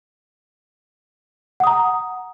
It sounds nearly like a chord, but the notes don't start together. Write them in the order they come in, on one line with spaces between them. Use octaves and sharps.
F#5 D#6 A#5